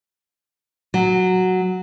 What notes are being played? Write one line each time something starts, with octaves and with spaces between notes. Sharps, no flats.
F#3